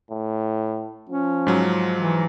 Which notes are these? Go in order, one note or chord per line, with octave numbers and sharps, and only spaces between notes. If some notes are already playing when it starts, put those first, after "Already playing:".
A2
F3 C#4
G#2 F#3
E3